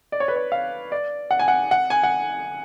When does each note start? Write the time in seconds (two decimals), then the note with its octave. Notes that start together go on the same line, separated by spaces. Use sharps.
0.12 D5
0.20 C#5
0.28 B4
0.36 C#5
0.52 F5
0.92 D5
1.31 F#5
1.39 G#5
1.48 F#5
1.71 F#5
1.90 G#5
2.03 F#5